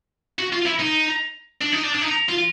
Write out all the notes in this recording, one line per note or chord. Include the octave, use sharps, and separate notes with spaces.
F#4
F4
E4
D#4
D4
D#4
D4
D4
D#4
F4